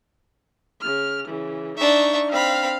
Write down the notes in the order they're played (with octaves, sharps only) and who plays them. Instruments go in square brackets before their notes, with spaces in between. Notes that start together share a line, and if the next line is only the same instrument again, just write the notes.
[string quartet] C#3 F6
C#3 E3
[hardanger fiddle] D4 E5 [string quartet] D#4 C#6
[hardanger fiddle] C4 B5 [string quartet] F5